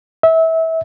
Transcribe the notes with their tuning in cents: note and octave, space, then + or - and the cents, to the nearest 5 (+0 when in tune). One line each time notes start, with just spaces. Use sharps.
E5 -25